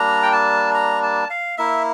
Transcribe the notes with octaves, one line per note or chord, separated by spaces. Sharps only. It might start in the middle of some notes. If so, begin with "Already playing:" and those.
Already playing: G3 A#3 D4 A#5
G5
A5
A#5
A5
F5
A#3 E4 E5